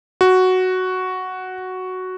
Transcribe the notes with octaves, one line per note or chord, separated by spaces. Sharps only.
F#4